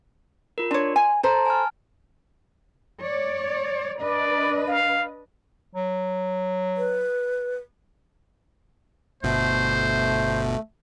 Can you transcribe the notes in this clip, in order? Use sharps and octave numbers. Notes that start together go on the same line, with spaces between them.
F4 A#4
D4 C#5 D5 C6
G#5
A4 C5 A5 A#5 C6
G#5 A5 F6
C#5 D5
D4 B4 D5 D#5
F5
F#3
B4
G1 B2 A3 C5